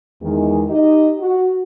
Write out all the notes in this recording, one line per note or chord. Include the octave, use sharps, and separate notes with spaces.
E2 D#3 G#3
D#4 G4 D#5
F#4